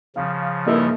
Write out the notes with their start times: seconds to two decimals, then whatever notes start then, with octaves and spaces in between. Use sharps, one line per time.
0.16 C#3 F3 F5
0.66 G2 A#3 D#4 E4 A4 D#5